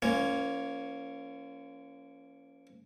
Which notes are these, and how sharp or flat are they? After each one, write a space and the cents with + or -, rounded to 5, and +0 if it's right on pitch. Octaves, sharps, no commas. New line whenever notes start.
F3 -40 A#3 +0 C#4 +0